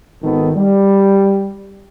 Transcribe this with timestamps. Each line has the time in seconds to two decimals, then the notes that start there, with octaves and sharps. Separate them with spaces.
0.23 G#1 D#3 B3 D#4 A4
0.56 G3